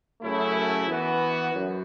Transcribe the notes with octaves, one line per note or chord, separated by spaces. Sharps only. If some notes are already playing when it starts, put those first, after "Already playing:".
F#2 C#3 A3 E4
E3 B3 F#4
F#2